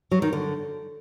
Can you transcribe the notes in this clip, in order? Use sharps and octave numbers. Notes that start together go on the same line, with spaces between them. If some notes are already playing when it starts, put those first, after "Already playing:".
F#3
D#3
D3